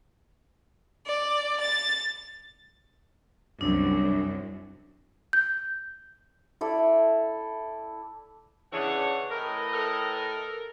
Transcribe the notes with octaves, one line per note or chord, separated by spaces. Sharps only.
D5
A6
C2 F#2 D4
G6
E4 A4 D5
C#3 E3 D4 C#5 F#5
A2 A#4 B4 D#5
A4 A#4